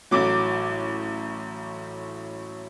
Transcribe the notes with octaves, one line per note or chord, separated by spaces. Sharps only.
A1 A2 F#3 D6